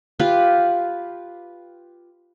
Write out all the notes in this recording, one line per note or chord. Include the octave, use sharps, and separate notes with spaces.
F4 G4 B4